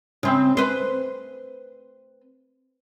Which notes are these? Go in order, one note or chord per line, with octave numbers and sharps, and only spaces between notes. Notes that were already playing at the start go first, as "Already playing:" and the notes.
C#3 C4
B4 C5